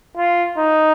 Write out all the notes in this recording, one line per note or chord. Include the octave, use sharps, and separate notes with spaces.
F4
D#4